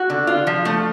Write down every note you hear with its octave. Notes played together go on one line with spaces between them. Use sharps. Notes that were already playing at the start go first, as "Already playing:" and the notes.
Already playing: F#4
D3
F4
F3
A3